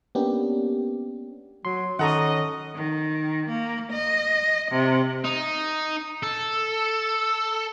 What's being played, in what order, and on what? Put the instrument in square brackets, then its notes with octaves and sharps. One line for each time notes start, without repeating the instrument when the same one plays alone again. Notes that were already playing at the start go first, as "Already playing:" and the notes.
[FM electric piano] A#3 B3 C#4 D4 G4
[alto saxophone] F#3 [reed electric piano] C6
[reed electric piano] D#3 A4 [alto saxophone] C#4 [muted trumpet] D#5 [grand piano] F#5 A#5 C#6
[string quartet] D#3
A#3
D#5
C3
[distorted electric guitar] D#4
A4